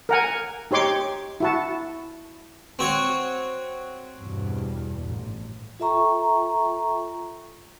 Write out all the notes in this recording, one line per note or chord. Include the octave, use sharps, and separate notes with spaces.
A#4 F#5 G#5
D#4 G4 C#5 C6 D6
E4 F#4 A5
C4 F#4 C#5
E2 G2 B2
A1
F4 A4 E5 G5 A#5 C#6